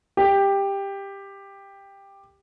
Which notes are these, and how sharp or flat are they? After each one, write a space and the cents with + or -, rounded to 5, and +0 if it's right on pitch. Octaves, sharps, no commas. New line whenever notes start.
G4 +10